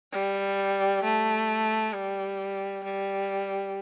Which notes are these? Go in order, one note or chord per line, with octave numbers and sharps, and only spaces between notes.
G3
A3
G3
G3